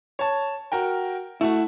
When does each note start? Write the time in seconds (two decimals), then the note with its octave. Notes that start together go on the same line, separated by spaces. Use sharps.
0.19 C#5 A5
0.72 F#4 A#4 G5
1.41 A3 E4 F#4